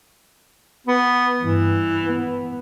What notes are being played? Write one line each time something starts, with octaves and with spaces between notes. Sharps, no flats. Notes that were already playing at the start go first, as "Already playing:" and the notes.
B3
G2 E3
B3